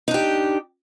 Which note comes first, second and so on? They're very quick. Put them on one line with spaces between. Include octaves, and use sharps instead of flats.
D#4 D4 G4